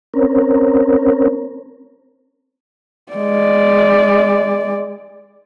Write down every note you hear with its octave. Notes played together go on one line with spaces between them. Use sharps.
C4 C#4 A#4
G#3 D5